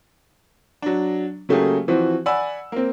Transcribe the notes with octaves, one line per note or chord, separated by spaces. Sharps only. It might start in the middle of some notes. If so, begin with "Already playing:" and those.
F#3 D4
C#3 F#3 A3 A#3 G4 G#4
E3 F3 C4 F#4
D5 F#5 G#5 B5 E6
A#3 C4